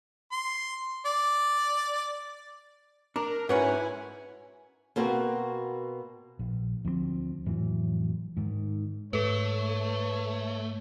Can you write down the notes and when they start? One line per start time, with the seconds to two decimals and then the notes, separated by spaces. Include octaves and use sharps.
0.32 C6
1.06 D5
3.16 D4 A#4
3.49 G#2 C#4 E4 F#4 B4 F#5 G#5
4.96 B2 A#3 C4 F#4
6.39 A#1
6.85 D2 F3 G#3 C4
7.46 F1 A2 E3 F#3
8.37 G#2 D#3
9.13 G#2 A3 A4 B4 C#5